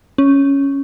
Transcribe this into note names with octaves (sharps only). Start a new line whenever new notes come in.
C#4